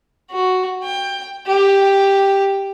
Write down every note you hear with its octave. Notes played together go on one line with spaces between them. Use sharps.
F#4
G5
G4